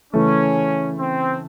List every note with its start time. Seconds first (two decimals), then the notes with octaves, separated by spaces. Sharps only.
0.14 C#3 E3 A3 C#4
0.99 C4